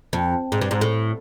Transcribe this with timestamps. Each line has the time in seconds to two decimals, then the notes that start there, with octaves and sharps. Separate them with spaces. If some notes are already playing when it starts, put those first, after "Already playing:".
0.13 F2
0.52 G#2
0.61 G2
0.71 G#2
0.81 A2